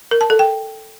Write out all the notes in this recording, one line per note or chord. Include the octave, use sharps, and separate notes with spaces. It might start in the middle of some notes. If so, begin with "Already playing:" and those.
A#4
A5
A4
G5